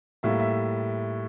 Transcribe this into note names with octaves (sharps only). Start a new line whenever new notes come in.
A2 G3 A#3 E5
E5